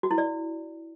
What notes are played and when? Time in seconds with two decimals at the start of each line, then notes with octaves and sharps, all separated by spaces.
0.03 F#4
0.11 E4
0.18 D5